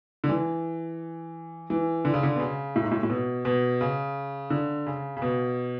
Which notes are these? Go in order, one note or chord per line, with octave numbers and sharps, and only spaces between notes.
D3
E3
E3
D3
C#3
D3
B2
C#3
A2
G#2
A2
A2
B2
B2
C#3
D3
C#3
C#3
B2